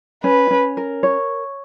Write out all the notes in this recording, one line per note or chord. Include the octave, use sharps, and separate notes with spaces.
C#4 B4
C#4
A#4
C#5